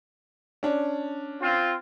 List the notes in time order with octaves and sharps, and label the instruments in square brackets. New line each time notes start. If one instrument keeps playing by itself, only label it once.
[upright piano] C#4 D4
[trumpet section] C4 F4